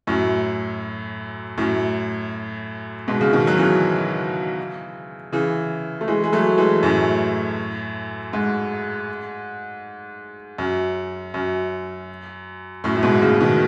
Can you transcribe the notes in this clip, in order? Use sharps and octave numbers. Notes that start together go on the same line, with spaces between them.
F#2 A2
F#2 A2
G#2 B2
C#3
B2 D#3
F#3
C#3 E3
C#3 E3
A3
E3 G#3
G#3
F#3 A3
E3 G#3
F#2 A2
G#2
F#2
F#2
F#2 A2
A2
G#2 B2
A2 C#3
B2 D#3